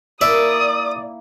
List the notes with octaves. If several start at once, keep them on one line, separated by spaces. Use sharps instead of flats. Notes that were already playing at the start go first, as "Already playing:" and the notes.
A#3 E4 D5 E5 G#5 D#6